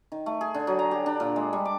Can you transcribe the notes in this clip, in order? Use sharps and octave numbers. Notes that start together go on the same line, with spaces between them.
D#3
A3
G#4
D3
F#3
A#5
G4
D4
A#2
G#3
G3
D6